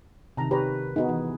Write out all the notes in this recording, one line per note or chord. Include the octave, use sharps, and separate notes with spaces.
C3 D#3 A5 A#5
G4 B4 C#5 A#5
B3 D#4 F#4 G#4
E3